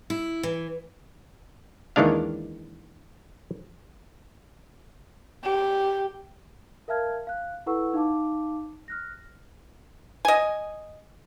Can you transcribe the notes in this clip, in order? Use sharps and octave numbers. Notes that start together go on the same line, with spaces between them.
E4
E3
D#2 D#3 E3 G#3 D4 F5
G4
A#4 E5 F5 A5 F6 G#6
F5 F#6
E4 A4 B4 F#5 C#6 E6
D#4 F5 A5 D6
F6 F#6 A#6
D#5 G#5